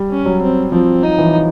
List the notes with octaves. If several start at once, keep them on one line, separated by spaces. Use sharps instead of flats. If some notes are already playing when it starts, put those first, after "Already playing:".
Already playing: G3
C#4
F#3
C4
F3 C4
D#4
E3